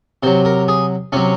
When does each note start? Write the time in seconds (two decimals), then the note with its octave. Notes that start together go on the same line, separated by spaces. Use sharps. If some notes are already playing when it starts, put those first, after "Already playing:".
0.23 C3 F#3 C5
0.45 A#4
0.68 G#4
1.12 C3 F#3 C#4